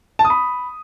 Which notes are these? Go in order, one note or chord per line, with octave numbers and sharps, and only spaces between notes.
A5
D#6
B5